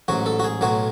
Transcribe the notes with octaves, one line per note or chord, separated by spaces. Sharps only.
A1 G#2 F#3 F#4
A4
F#4
G#4
B1 A2 F#3 F#4